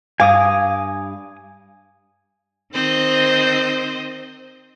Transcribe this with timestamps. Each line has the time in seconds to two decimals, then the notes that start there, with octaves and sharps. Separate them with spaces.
0.20 G2 F5 G#5 D6 D#6
2.73 D#3 C4 C5 D#5